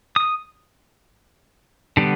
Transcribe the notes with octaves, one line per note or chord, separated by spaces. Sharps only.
D#6
D3 G3 B3